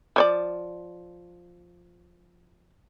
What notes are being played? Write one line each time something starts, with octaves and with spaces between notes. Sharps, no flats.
F3 C#5 D5